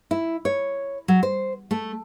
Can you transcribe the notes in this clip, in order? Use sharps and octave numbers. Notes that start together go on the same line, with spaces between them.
E4
C#5
F#3
C5
A3